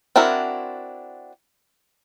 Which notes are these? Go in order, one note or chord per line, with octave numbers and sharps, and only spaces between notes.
C4 D4 E4 F#4 A#4